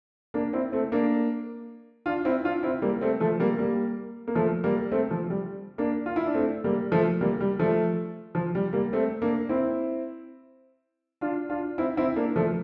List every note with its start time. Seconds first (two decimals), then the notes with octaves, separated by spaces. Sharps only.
0.34 A#3 D4
0.53 C4 E4
0.72 A3 C4
0.92 A#3 D4
2.06 D4 F4
2.25 C4 E4
2.44 D4 F4
2.63 C4 E4
2.82 G3 A#3
3.01 A3 C4
3.20 F3 A3
3.40 G3 A#3
3.58 G3 A#3
4.28 A#3
4.35 F3 A3
4.64 G3 A#3
4.92 A3 C4
5.11 F3
5.30 G3
5.78 A#3 D4
6.06 F4
6.16 E4
6.26 D4
6.35 A3 C4
6.64 G3 A#3
6.92 F3 A3
7.21 G3 A#3
7.40 G3
7.59 F3 A3
8.35 F3
8.55 G3
8.73 G3 A#3
8.93 A3 C4
9.22 A#3 D4
9.49 C4 E4
11.21 D4 F4
11.49 D4 F4
11.78 C4 E4
11.97 C4 E4
12.16 A#3 D4
12.36 F3 A3